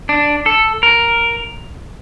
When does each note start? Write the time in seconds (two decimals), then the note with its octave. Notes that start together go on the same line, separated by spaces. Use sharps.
0.09 D4
0.46 A4
0.83 A#4